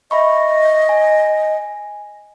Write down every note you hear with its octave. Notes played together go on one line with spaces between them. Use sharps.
D#5 E5 B5 C#6
G#5